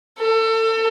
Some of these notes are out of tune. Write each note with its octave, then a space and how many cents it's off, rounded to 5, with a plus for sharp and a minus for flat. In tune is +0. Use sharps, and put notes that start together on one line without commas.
A4 +30